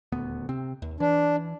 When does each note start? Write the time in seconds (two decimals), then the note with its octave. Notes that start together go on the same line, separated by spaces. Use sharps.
0.12 D#1 D2 B3
0.49 C3 C4
0.82 D#2
1.00 E3 D4